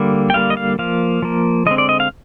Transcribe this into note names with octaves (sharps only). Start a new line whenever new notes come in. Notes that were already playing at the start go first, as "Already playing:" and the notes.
Already playing: D3 G3 A#3
G5
D3 G3 A#3 F5
D#5
F5
F3 A#3 F5
F3 A#3
D3 G#3 C4 D#5
D5
D#5
F5